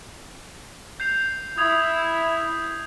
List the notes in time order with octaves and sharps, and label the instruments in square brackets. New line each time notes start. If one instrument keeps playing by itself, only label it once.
[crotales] G6 C7 F7
[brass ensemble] E4 [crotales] D#6 G#6 F7